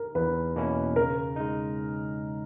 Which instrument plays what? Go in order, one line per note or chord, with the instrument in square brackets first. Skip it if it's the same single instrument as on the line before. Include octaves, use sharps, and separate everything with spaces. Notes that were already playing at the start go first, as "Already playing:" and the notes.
Already playing: [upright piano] A#4
[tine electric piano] E2 [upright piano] B4
[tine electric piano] B2 A#3 C#4 E4
[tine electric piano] C#3 [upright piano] A#4
[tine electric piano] G#3 D#4